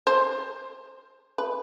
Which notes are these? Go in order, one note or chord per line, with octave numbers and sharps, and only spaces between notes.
C5
B4